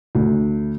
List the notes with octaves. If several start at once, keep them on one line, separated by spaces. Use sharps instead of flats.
D2